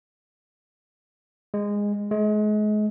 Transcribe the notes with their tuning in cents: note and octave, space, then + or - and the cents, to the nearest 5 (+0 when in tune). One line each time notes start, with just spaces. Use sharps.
G#3 -15
G#3 +35